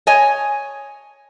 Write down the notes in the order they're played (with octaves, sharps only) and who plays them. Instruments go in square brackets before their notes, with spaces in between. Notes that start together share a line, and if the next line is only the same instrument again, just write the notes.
[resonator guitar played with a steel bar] C#5 D#5 G#5